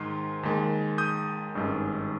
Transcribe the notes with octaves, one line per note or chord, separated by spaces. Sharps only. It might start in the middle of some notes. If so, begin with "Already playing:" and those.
Already playing: G#2 D#3 G#3 C6
D#2 D#3 G#3
D#6 G6
G#1 G2 D#3 G#3 C#4